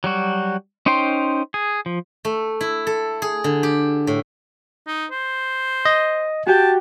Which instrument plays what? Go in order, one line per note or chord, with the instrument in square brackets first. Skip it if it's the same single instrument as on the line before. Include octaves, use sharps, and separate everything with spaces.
[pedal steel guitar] F#3 G3 F#4
C#4 D#4 C5 G5 C6
G#4
F3
[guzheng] A3
E4
A4
G#4
D3
G4
A2
[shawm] D#4
C5
[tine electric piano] D#5
[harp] F#4 G4 G5 [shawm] A5